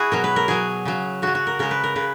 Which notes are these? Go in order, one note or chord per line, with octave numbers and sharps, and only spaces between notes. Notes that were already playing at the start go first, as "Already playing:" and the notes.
Already playing: E4 F#4 G#4
B2 F#3 A#4
B4
A#4
B2 F#3 G#4
C#3 F#3
C#3 F#3 F#4
F#4
A#4
C#3 G#3 A#4
B4
A#4
C#3 B4